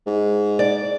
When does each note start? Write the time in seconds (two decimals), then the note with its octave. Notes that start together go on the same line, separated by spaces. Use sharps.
0.07 G#2
0.59 D5